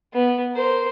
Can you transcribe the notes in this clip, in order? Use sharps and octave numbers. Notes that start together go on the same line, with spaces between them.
B3
A#4 C5